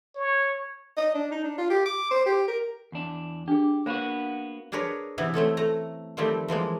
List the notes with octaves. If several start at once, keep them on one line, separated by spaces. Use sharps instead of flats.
C#5
D#5
D4
D#4
D4
F4
G4
D6
C5
G4
A#4
E2 D4
D4 G4 G#4
A#3 B3 F#4 C5 F5 B5
D4 G#4 A#4 B4 C#5
C3 E3 B3 E4
A3 C4 C#4 A4
A3 A#5
D#3 F3 G3 A3 C4
E3 F3 G#3 A#3